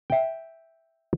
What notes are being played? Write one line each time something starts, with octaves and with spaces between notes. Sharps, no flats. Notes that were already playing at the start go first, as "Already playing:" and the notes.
E5 G5